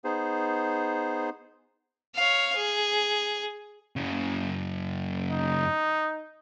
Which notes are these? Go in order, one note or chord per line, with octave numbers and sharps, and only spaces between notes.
B3 D#4 G#4 C5
C#5 F5
G#4
F#2 C#3
D#4